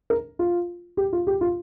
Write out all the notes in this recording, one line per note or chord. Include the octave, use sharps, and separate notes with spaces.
A#4
F4
G4
F4
G4
F4